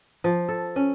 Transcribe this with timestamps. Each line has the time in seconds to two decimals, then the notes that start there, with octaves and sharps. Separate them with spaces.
0.24 F3
0.49 A4
0.76 C#4